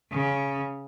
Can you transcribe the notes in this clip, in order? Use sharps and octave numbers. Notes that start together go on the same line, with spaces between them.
C#3